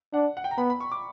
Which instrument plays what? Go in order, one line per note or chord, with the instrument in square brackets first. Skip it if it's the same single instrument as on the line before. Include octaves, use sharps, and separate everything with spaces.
[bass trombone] D4 [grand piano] F#5
[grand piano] F#5
G5
A#5
[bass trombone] B3 [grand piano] B5
[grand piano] B5
C#6
D6